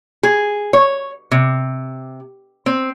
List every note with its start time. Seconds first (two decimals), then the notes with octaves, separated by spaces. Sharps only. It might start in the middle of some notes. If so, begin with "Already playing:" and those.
0.23 G#4
0.73 C#5
1.31 C3
2.66 C4